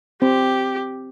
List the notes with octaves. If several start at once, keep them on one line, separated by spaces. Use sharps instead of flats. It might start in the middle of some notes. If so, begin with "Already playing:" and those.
C4 G4